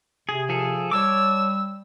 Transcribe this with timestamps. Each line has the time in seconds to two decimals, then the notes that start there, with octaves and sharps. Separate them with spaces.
0.29 C3 G#4
0.49 F3 G#4 A4
0.91 G3 C#5 A5 D6 E6